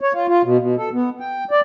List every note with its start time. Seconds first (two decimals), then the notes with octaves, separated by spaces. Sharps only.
0.01 C#5
0.13 F4
0.28 F4
0.44 B2
0.59 B2
0.78 A4
0.93 B3
1.20 G5
1.51 D5